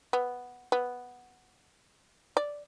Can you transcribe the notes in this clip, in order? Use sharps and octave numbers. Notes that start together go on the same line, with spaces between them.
B3
B3
D5